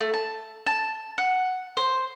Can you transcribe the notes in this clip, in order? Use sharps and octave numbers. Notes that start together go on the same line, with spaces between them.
A3
A5
A5
F#5
C5